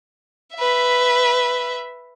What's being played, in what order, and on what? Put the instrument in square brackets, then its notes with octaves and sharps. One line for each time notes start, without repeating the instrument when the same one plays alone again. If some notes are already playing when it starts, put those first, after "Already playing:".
[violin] B4 E5